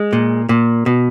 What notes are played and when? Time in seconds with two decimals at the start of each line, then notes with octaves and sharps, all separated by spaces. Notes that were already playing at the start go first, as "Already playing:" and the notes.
Already playing: G#3
0.13 A#2
0.49 A#2
0.86 B2